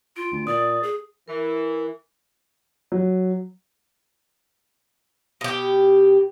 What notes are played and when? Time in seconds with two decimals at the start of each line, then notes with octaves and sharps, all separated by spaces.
0.16 F4 D7
0.32 D2
0.47 A#2 D5 D#6
0.83 G#4
1.28 E3 A#4
2.92 F#3
5.41 B2 G4